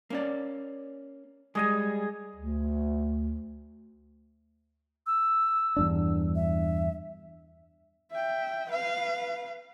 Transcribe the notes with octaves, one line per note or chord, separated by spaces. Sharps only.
A#3 C#4 D5
G3 G#3 G#4 D#5 G#5
D2
E6
E2 G2 D4
E5
E5 G5
B4 F5